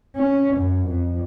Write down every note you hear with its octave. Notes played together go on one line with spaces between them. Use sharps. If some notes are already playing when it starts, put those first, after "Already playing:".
C#4
F#2
F2